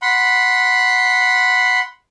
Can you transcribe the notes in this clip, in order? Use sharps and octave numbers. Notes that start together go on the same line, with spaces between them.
F#5 B5 C6